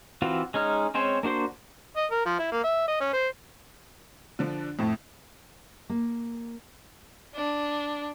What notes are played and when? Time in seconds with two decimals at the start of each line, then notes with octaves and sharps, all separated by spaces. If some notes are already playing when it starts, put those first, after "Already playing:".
0.22 E3 C4 F4 F#4
0.54 G#3 C#4 D#4 F6
0.94 G#3 C4 C#4 C5 C#5
1.23 A#3 D4 F#4 C5 C6
1.97 D#5
2.11 A#4
2.26 F3
2.39 E4
2.52 A#3
2.64 E5
2.88 D#5
3.00 C#4
3.13 C5
4.39 D3 F3 D4
4.79 F2 A2 A3
5.90 A#3
7.35 D4